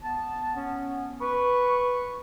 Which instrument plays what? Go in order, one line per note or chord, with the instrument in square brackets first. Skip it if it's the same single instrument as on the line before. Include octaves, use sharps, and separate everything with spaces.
[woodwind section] B3 A5
B3 C#4
[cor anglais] B4 [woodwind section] C#6